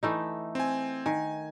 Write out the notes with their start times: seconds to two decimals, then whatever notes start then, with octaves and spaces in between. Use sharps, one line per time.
0.03 E3 A3 D#4
0.55 C4 G#5
1.06 D#3 G#5